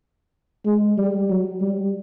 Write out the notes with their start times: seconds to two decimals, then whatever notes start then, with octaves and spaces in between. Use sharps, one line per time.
0.66 G#3
0.98 G3
1.30 F#3
1.62 G3